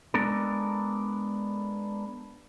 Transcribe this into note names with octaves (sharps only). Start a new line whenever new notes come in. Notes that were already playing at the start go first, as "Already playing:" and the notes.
G#3 B3 D4 A4 A#4